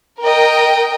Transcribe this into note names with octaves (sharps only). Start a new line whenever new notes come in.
A#4 D#5 G5